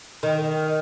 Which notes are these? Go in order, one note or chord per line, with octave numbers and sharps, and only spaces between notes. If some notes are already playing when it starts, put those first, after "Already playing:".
D#3